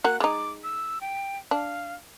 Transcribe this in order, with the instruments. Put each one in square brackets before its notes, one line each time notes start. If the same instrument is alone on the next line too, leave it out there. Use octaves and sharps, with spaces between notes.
[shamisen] A#3 F#4 [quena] F#6
[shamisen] G#3 D#4 [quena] D6
[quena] E6
G5
[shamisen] D4 [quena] F5